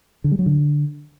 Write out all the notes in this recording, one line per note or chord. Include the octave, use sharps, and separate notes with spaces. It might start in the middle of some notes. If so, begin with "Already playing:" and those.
D3
G3
F#3
D3